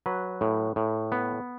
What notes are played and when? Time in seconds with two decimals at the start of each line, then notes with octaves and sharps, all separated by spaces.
0.06 F#3 B4
0.41 A2
0.76 A2
1.12 B3